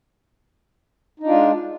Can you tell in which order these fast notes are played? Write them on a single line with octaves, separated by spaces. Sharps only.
D#4 D4 F4 G#3